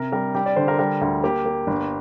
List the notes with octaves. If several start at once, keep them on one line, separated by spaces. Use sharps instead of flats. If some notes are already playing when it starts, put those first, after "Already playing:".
Already playing: C3 A#4
G3 A#4
G3 G4
D5
D3 C5
A#4
G3 A#4
D2
A#3 G4
A#3
G1